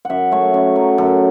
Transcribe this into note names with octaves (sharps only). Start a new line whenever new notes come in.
F#2 E5 F#5
A3 C#5
F#2
F#3
F#2 A4